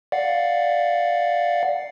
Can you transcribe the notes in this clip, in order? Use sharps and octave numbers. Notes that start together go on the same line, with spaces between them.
D5 F5 F#5